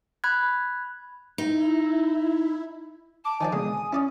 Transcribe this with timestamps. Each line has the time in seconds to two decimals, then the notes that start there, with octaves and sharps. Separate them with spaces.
0.24 B5 F#6 G#6
1.38 D#4 E4
3.25 A5 D6
3.41 D#3 F3 D#4 D5 G#5
3.52 B2 D3 G#3 D#6
3.93 C#4 E4 D5 D#6